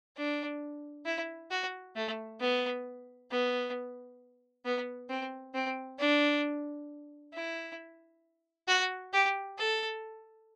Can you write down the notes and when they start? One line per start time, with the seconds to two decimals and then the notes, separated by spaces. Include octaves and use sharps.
0.17 D4
1.05 E4
1.51 F#4
1.96 A3
2.40 B3
3.30 B3
4.65 B3
5.09 C4
5.54 C4
5.99 D4
7.33 E4
8.68 F#4
9.13 G4
9.58 A4